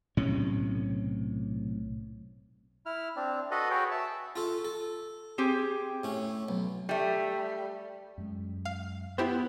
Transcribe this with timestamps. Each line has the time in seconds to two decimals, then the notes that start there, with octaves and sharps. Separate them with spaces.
0.17 B1 A2 C3 C#4
2.86 E4 F6
3.16 C4 D4
3.51 F#4 A4 B4 D#5
3.70 F#4 G#4 B4 C#5 G5
3.91 E5 A5
4.36 F4 A4
4.65 A4
5.38 C4 G4 G#4
6.04 A2 C#4
6.49 B1
6.89 G3 A3
8.18 F#2 G#3
8.65 F5
9.18 B3 E4 G4 C5